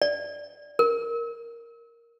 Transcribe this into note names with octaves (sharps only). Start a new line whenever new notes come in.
D5
A#4